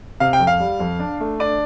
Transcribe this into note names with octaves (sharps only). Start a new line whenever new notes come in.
C3 F5
G5
F2
F5
G3
F2
D4
A3
D4 D5